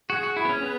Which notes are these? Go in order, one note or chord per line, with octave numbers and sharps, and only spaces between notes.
F#4 G#4
F#4
E4 G#4
B3
C#4
B3 B4